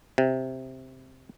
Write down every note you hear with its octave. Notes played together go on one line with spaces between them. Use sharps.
C3